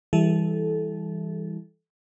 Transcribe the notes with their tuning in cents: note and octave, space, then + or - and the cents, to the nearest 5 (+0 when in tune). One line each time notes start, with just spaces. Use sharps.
E3 +0 G3 +25 A4 -20